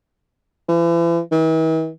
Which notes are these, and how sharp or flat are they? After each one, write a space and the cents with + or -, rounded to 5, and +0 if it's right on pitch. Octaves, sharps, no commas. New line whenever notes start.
E3 +40
E3 -45